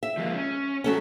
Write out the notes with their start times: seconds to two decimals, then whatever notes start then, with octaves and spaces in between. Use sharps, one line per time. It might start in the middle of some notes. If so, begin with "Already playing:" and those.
0.03 E5
0.17 F3 G#3 A#3
0.35 C#4
0.84 F#3 A3 C#4